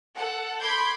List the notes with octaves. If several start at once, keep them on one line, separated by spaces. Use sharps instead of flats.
A4 F#5
B5 C6 D6 G6 G#6